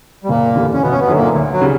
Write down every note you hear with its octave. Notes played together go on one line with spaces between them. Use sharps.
G3
F#1 A#2 A#3
E2 D3 G3
C#4
G1 B2 B3
C#4
B2 B3
F#2 D3 F#3 C#4
A#2 A#3
D2
F#3
C#3 G3